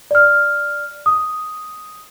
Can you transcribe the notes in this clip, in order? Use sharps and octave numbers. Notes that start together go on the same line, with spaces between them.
D5 F6
D#6